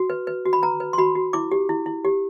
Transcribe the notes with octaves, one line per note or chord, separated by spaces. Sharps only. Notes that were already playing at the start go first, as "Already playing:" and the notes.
Already playing: F#4
B4
B4
F#4
B5
B4 A#5
B4
C6
F#4 B5
F#4
E4 D6
G4
E4
E4
G4